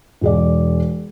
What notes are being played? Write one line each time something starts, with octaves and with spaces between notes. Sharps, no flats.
E1 G#4 D5